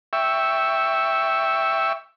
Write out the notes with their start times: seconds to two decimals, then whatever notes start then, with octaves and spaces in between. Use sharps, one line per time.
0.13 E5 G5 C#6 E6